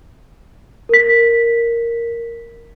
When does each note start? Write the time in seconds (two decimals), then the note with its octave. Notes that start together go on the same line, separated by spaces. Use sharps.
0.89 A#4 B6